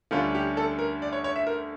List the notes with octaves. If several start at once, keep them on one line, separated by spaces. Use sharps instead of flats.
D2 D3 G3 C#4 F4
G4
A4
A#4
D5
C#5
C#5
E5
A#4